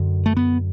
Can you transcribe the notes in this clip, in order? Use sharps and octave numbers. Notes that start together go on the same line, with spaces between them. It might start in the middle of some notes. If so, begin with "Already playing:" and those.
Already playing: F#2 D3
A3
B3